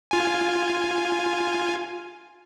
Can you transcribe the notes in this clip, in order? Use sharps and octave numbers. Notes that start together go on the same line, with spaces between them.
F4 G#5